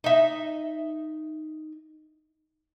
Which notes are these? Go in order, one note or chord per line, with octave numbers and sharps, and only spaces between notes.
D#4 E5